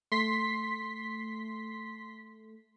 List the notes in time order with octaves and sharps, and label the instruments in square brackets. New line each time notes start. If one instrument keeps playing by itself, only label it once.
[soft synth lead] A3 [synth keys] C6 B6